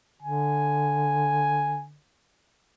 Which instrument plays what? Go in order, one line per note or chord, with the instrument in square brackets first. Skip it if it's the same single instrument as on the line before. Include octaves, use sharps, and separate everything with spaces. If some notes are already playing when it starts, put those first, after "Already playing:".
[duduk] D3 [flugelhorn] G#5